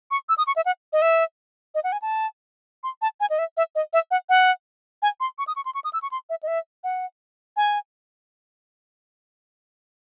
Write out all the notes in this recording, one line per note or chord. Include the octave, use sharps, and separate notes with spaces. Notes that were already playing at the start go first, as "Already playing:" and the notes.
C#6
E6
D#6
C#6
E5
F#5
D#5
E5
D#5
F#5
G#5
A5
C6
A5
G#5
D#5
E5
E5
D#5
E5
F#5
F#5
G#5
C6
C#6
D#6
C#6
C6
C#6
D#6
E6
C#6
C6
E5
D#5
E5
F#5
G#5